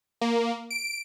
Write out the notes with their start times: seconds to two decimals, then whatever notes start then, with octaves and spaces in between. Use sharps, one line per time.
0.21 A#3
0.71 D7